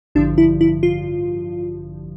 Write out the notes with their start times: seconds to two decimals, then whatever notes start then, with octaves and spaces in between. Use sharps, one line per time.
0.15 A1 G2 D3 F3 D4
0.38 E4
0.61 E4
0.83 F4